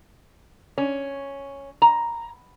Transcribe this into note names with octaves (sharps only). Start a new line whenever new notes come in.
C#4
A#5